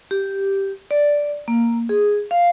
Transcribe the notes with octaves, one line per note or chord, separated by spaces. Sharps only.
G4
D5
A#3
G#4
F5